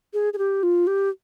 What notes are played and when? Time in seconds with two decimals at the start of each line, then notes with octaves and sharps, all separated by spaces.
0.14 G#4
0.33 G#4
0.38 G4
0.63 F4
0.87 G4